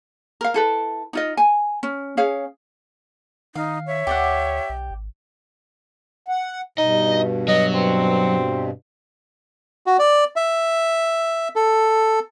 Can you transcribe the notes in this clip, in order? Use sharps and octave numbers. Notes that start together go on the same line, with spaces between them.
A#4 F5
E4 A4 B4
D#4 F4 D#5
G#5
C#4
C#4 G#4 C#5 F5
D#3 D#4 F5
C#5 E5
D2 G4 D5 F#5
B1
G#1
F#5
G2 B2 D#4 D#5
F#3 D#5
C4
F#4
D5
E5
A4